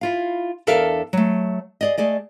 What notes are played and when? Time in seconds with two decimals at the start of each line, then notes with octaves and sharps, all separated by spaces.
0.01 E4 F4 F5
0.67 E2 D4 A4 A#4 E5 F5
1.13 F#3 A3
1.81 G#4 D5 D#5
1.97 A3 G#4 D5 D#5